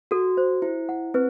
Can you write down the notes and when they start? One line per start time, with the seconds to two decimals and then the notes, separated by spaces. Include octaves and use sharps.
0.11 F#4 A4
0.37 C5
0.62 E4 C5
0.89 F#5
1.14 C4 B4